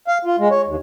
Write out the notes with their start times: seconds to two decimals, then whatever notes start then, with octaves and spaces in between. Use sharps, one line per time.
0.08 F5
0.25 F4
0.39 G#3
0.51 C#5
0.67 D#2